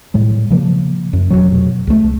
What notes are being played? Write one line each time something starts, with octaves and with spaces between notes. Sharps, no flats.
A2 G3 G#3
C#3 F3 A#3
F#2
F1 C#2 B2 F#3
C#2 A3